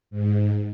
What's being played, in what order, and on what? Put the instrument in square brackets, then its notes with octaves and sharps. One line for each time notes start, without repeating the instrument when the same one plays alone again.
[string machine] G#2